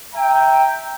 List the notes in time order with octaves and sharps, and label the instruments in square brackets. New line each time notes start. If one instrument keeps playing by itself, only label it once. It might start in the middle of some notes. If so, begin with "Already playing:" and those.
[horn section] E5 G5 A#5